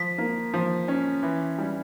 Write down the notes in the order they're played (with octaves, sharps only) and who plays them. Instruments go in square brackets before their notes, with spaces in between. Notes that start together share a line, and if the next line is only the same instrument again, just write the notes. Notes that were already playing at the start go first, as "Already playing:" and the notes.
Already playing: [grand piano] F3 [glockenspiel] B6
[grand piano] A#3
F3
C#4
E3
G3